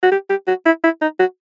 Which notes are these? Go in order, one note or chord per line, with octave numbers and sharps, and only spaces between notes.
F#4
G4
G4
F#4
E4
E4
D#4
F#4